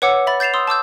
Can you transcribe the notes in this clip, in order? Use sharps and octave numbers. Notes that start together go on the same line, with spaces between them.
B4 C#5 F#5 D6 E6 C#7
E5 B5 A6
G6 A6 C7 E7 F7
C6 D#6 E6
A5 D6 E6 G6